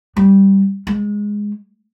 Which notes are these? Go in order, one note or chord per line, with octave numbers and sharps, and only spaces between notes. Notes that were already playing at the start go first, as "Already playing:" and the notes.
G3
G#3